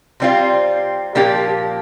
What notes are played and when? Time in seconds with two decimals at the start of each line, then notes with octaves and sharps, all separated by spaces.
0.20 C3 G3 C4 F4
1.15 A#2 F3 A#3 D4 G4